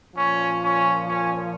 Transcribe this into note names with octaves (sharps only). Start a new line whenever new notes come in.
A#2 F3 C#4
C#4
C#4